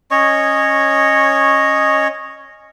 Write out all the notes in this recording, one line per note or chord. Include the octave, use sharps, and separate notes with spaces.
C#4 C#5 D#5 C#6